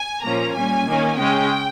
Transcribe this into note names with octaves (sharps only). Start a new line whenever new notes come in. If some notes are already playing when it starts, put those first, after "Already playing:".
Already playing: G#5
A#2 F3 A#3 C#4 A#5
A#2 G3 C#4 G#5
D#3 A#3 C#4
C#3 G#3 C#4 G5